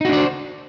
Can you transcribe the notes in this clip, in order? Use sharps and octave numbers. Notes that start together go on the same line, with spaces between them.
D4 D#4 F#4 C5 D5